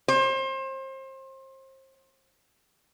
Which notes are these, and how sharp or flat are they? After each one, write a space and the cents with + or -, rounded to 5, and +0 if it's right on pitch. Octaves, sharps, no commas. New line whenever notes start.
C5 +30